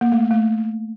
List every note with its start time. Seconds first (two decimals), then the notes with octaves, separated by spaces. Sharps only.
0.01 A#3
0.12 A3
0.31 A3